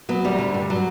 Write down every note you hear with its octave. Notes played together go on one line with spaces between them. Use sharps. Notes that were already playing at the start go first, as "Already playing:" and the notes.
F#3 B3
D2 G3
D3
G2
F#3